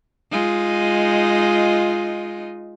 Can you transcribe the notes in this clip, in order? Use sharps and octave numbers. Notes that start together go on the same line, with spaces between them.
G#3 D#4 F4